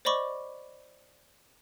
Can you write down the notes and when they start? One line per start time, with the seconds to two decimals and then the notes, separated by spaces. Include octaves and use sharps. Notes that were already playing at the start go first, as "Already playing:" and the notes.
0.05 C5 D5 D#5 B5 C#6 D6